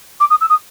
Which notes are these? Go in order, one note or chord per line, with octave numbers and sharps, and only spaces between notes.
D6
D#6
E6
D#6